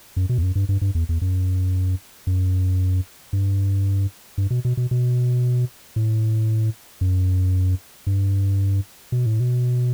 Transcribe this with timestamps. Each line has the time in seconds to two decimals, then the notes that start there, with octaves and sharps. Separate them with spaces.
0.17 F#2
0.29 B2
0.38 E2
0.43 F#2
0.55 G2
0.69 G2
0.81 G2
0.95 E2
1.09 E2
1.21 F#2
2.27 F#2
3.33 G2
4.38 G2
4.50 B2
4.65 B2
4.77 B2
4.91 B2
5.96 A2
7.01 F#2
8.07 G2
9.12 B2
9.26 A2
9.40 B2